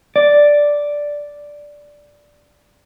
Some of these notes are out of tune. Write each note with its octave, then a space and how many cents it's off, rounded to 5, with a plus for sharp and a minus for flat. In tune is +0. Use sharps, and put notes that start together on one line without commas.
D5 -5